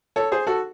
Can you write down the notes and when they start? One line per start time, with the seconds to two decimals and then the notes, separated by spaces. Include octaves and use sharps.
0.16 A4 C#5
0.32 G#4 C5
0.47 F#4 A4